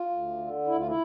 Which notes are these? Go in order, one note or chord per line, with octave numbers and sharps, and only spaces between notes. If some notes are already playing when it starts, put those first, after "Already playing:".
Already playing: F4
D2
D3
D2 E4
F4
E4